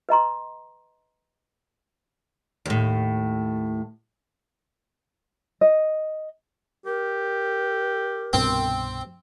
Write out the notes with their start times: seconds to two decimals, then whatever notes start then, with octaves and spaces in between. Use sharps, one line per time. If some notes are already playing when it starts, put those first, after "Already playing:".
0.09 B4 D#5 A#5 C6
2.65 D#2 A2
5.61 D#5
6.86 G4 A#4
8.33 C2 G2 B2 C4